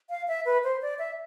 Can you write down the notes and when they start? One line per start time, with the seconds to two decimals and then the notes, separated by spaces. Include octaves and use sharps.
0.10 F5
0.28 E5
0.46 B4
0.64 C5
0.82 D5
0.99 E5